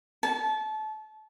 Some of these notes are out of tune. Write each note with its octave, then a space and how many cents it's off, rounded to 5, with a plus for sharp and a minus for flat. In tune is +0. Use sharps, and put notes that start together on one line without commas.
A5 -25